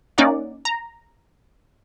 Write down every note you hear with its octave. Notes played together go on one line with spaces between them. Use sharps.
A#3 C#4 D#4 D5 F#5
A#5